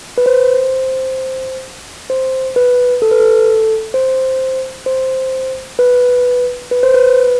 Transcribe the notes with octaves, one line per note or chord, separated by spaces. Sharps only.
B4
C5
C5
B4
A4
B4
A4
C5
C5
B4
B4
C5
B4